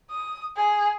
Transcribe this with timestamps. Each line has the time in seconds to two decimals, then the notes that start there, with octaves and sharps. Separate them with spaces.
0.10 D#6
0.56 G#4